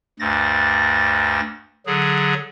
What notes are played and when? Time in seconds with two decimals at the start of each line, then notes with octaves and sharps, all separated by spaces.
0.20 D2 G2 A6 A#6
1.86 D3 F#3 G#4